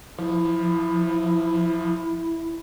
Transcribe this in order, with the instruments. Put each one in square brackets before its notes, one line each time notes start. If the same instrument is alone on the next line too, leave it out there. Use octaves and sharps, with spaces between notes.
[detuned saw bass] F3 [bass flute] E4